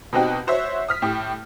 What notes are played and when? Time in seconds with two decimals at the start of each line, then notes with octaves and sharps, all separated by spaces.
0.13 B2 C4 D#4 F#4 G4
0.47 F#4 C5 C#5 E5
0.88 D#6 F6 B6
1.02 A2 G4